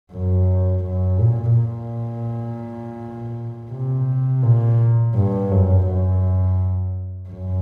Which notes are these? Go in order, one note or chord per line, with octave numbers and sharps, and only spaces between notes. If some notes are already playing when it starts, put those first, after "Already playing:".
F#2
F#2
A#2
A#2
C3
A#2
G2
F#2
F#2
F#2